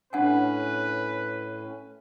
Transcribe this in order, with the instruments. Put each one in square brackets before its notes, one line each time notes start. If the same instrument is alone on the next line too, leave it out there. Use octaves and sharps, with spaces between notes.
[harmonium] A2 C#4 [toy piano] D4 F#5 G#5 [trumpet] B4